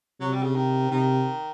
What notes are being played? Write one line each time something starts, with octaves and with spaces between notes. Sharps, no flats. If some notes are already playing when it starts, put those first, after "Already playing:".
C3 F#3
G3
C#3
D#3
C3 D#3